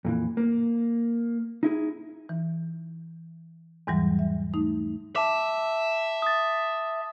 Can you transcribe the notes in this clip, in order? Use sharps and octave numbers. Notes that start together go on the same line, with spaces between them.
F2 A#2 E3
A#3
D#4 E4 G#4
E3
E2 G#2 E3 F#3 G3
E5
A3 D#4
E5 A5 D6
D#6 A6